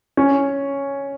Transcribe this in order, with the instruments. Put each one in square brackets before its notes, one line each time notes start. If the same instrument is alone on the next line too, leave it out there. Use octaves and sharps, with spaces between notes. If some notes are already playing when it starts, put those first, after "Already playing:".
[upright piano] C#4